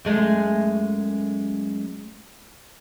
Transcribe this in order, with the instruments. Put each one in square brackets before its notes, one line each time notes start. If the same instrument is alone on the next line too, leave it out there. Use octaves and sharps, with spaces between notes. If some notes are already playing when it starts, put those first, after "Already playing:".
[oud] F#2 G#3 A3